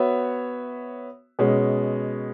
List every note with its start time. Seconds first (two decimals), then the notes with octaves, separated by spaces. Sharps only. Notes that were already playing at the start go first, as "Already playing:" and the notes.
Already playing: B3 F#4 C#5 E5
1.39 B2 G#3 C#4